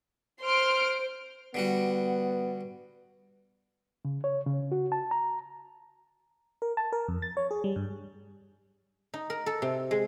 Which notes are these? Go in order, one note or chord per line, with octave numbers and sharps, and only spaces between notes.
C5 C6 F6 D7
D3 G3 B3 F#4
C#3
C#5
C#3
F#4
A5
A#5
A#4
A5
A#4
F2
A6
C#5
G#4
G3
G2
D#4
A#4
A4
C3
G#3